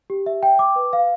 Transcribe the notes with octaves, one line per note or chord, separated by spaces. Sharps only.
G4
E5
G5
D6
B4
F5